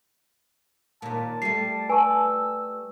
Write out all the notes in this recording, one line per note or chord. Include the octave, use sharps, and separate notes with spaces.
D#2 A#2 A5
G3 A3 C7
B4 G#5 A5 C#6 E6